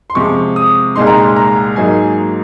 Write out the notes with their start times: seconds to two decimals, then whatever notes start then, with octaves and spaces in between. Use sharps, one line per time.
0.10 C6
0.15 C3 F3 G#3 C#6
0.56 D#6
0.95 C2 A#2 G#3 D#4 C6
1.07 A#5
1.17 C6
1.36 A#5
1.76 G#2 F#3 A#3 D#4 G#5